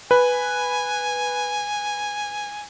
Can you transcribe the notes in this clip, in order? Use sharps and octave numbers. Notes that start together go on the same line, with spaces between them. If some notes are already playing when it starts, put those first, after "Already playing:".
B4 G#5